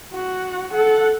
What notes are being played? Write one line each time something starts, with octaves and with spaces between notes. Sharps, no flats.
F#4
A4 F#5